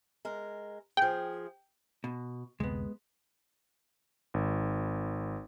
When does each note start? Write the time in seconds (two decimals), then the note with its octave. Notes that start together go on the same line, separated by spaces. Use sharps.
0.25 G#3 A#4
0.97 F3 G#4 G5
2.04 B2
2.60 F#1 D2 C3 G#3 B3
4.34 G#1